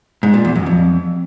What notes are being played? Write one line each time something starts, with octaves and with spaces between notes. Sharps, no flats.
G#2
A#2
E2
F#2
F2